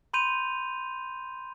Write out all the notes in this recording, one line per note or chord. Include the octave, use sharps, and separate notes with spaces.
B5 C6 G6 D#7 F7